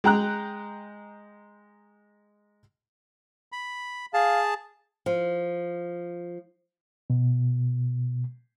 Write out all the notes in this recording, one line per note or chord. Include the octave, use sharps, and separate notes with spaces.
G#3 G5 A#5 F#6
B5
G#4 F5 A5
F3
B2